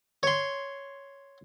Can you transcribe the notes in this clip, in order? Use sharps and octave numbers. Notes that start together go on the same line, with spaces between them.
C#5 C6